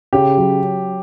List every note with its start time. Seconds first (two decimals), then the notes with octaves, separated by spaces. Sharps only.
0.13 C#3 G4
0.37 F#3